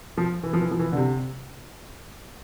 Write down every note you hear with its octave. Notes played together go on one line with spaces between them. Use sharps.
F3
E3
F3
E3
F3
E3
D3
C3